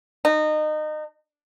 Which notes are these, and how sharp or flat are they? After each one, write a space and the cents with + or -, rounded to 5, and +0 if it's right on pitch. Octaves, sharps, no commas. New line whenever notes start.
D#4 -25